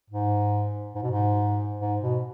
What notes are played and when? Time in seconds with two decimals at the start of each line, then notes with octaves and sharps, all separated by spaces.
0.10 G#2
0.95 G#2
1.03 B2
1.11 G#2
1.80 G#2
2.01 B2